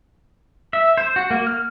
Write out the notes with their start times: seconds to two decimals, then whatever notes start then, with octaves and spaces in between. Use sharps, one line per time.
0.73 E5
0.97 C5
1.16 F#4
1.31 A#3
1.47 F6